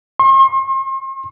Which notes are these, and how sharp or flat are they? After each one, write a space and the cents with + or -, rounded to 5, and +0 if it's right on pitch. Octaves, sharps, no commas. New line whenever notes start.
C6 +45